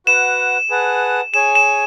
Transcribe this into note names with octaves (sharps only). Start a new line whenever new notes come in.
F#4 B4 F#5 E7
G#4 B4 F#5 A5
G#4 C#5 G#5 E7
E7